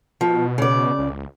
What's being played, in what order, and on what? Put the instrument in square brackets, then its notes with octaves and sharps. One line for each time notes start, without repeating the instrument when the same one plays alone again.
[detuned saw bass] B2 [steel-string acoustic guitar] F3
[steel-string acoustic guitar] C#3 D5
[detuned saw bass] C#2